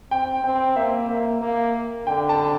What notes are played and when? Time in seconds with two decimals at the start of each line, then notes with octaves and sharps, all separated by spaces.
0.11 C4 G5
0.44 C4 G5
0.76 A#3 E5
1.10 A#3
1.42 A#3
2.07 D3 G5
2.29 A5